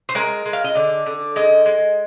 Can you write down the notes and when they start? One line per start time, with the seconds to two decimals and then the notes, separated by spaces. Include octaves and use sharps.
0.09 C5
0.15 G#3 A#4
0.45 G#3
0.53 F5
0.64 D#5
0.75 D3 D5
1.06 D3
1.36 G#3 D#5
1.66 G#3